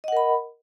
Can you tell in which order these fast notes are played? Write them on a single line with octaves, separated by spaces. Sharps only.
D#5 F#5 A#4 B5